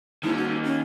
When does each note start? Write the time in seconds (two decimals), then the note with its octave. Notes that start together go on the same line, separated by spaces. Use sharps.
0.23 G2 B2 D#3 A#3 C#4 E4
0.37 F#4
0.64 C#4 F#4